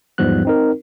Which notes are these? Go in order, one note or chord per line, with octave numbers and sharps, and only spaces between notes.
E2 G#2 F3 G3 B3 F#6
C4 D#4 A#4